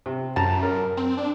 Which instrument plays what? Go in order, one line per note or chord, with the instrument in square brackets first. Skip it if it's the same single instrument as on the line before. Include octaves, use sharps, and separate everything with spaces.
[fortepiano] C3
[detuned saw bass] F#2 [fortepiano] A5 A#5
[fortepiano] A#4
[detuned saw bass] C4
D4